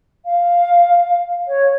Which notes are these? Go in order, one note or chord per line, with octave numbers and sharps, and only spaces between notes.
F5
C#5